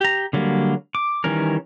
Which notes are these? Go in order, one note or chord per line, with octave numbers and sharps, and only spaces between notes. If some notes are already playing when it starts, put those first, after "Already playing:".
G4 A#5
D3 F#3 G3 A#3
D6
D#3 E3 G3 C#4 A#4